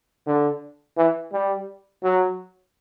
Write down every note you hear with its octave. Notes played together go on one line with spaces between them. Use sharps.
D3
E3
G3
F#3